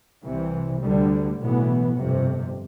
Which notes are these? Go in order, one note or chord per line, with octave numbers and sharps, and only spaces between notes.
C2 C3 E3
D2 D3 G3
B1 A2 E3 B3
G1 F2 C3